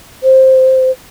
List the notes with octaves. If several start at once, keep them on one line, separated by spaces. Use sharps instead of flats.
C5